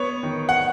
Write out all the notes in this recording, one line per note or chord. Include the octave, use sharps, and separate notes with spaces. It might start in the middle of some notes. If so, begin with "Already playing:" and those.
Already playing: B3 C#5
D#3
F#5